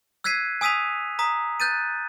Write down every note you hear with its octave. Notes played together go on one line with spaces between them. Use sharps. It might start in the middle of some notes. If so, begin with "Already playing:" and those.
E6 F#6 G#6 B6 C7 D#7
G#5 D#6 E6 B6 D#7 F7
A#5 D#6 B6
F#6 G6 A6 D#7